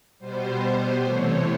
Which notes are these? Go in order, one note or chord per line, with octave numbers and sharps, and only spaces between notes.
B2 G3 B3 C5
C3 E3 A3 C#5